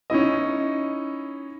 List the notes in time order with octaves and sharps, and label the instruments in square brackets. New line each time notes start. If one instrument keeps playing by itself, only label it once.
[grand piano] C#4 D#4 E4 D#5